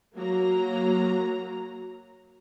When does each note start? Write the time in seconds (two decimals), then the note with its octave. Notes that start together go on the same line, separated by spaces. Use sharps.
0.16 F#3 A#3 A#5